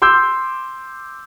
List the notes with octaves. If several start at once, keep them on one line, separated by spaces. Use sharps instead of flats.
C6 D6 E6 G6